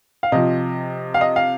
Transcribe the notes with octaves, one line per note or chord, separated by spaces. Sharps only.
F5
C3 F3 D#5
F5
D#5
F5